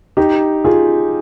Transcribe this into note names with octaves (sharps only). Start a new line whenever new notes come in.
D#4 G4
F4 G#4